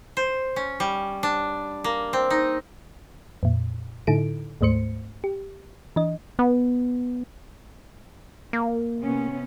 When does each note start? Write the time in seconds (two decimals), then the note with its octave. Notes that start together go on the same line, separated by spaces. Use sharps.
0.17 C5
0.56 C#4
0.80 G3
1.23 D4
1.84 A#3
2.13 C4
2.30 D#4
3.43 F2 A#2
4.07 A2 D3 D#4 E4 A4 D7
4.61 D2 G#2 A3 C5 C#7
5.24 G4
5.96 E3 D4 D#5
6.39 B3
8.53 A#3
9.00 C3 B3 C#4